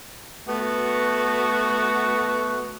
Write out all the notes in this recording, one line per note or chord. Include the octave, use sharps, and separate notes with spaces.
A3 B3 F#4